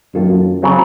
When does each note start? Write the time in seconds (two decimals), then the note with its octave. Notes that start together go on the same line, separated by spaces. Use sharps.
0.14 F#2 D#3 A#3 F4 A4
0.62 C#3 F#3 C4